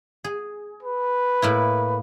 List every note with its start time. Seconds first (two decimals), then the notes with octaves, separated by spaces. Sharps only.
0.24 G#4
0.83 B4
1.42 A2 A#3 E4